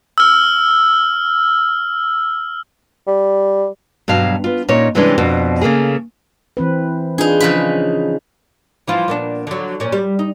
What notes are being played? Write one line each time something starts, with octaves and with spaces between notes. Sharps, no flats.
E6 F6
G3
G2 B2 F#3 F5 A5
B3 F4
A#2 C#4 D#4 C#5
C3 E3 G3 G#3 C#4 D4
F2 B2 D4
C#3 A3 A#3 G#4
E3 C4 B4
D4 D#4 F4 G#4 B4
C#3 F3 C#4 B4
E3 F3 F4
A#2 B3 D4
D3 F#3
A#2 C#4
G3
D#4